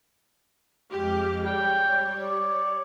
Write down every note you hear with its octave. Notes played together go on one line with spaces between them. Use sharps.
F2 G#3 G4 F6
G3 C#5 G5
D5